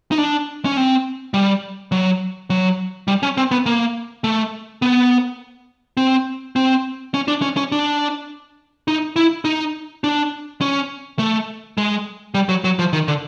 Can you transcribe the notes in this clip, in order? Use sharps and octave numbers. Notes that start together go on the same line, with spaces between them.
D#4
D4
C#4
C4
G3
F#3
F#3
G3
C#4
C4
B3
A#3
A3
B3
C4
C4
C#4
D4
C#4
C#4
D4
D#4
E4
D#4
D4
C#4
A3
G#3
G3
F#3
F#3
F3
D#3
D3